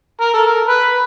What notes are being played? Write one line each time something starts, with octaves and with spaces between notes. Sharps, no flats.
A#4
A4
A#4
B4